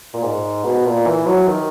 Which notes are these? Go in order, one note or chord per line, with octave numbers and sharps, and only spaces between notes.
A#2
G#2
B2
A#2
E3
F#3
D#3